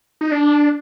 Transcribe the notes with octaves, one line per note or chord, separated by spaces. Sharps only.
D#4
D4